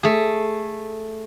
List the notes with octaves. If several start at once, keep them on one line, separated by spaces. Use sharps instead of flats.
A3 G#4